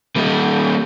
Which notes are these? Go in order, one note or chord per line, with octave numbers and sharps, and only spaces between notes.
G3 A#3